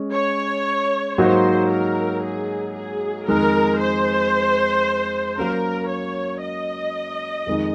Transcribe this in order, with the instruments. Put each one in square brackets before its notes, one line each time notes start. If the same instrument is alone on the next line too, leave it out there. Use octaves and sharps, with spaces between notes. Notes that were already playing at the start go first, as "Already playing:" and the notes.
Already playing: [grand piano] G#3 C#4
[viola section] C#5
[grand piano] G#2 F#3 A#3 D#4 F#4 [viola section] C5
[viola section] A#4
G#4
G#4
[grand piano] F2 D#3 G#3 D#4 [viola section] A#4
[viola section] C5
[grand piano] F#3 A#3 C#4 [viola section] A#4
[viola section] C#5
D#5
[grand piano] F2 D#3 G#3 D#4